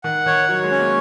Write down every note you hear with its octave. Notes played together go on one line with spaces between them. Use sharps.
D#3 F#5
D#3 C#5
F#3 C#5
G#3
C#4
A#3